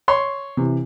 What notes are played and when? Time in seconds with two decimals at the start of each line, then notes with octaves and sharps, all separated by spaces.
0.08 C#5 C6
0.57 C3 E3